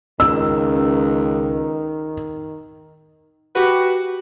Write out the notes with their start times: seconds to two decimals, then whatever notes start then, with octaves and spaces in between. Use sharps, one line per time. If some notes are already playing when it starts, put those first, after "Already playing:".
0.20 C#2 D#3 E6
3.55 F#4 G4 B4